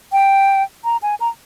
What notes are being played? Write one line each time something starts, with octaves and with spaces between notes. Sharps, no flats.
G5
A#5
G#5
A#5